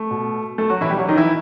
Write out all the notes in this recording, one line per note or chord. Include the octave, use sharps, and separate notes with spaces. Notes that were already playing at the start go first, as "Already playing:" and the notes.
Already playing: A3
B2
A3 A4
F#3 F#4
B2 E3 E4
G3 G4
F#3 F#4
D#3 D#4
E3 E4